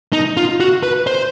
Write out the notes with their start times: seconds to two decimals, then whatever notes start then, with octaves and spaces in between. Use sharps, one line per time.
0.13 D#4
0.37 F4
0.60 F#4
0.83 B4
1.07 C5